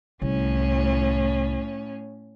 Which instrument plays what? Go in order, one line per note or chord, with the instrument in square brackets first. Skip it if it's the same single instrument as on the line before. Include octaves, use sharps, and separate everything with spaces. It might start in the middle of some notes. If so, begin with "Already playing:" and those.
[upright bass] C2 [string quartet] A2 C#4